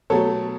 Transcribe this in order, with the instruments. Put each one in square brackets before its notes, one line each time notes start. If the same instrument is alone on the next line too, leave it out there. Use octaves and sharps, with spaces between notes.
[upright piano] B2 F#3 A3 [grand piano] A4 C#5